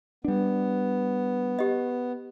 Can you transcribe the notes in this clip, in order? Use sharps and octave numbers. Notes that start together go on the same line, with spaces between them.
G3 B3 D4
G4 D#5